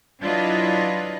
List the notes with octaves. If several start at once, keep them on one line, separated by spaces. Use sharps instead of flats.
F#3 D4 E4 F4 B4 D#5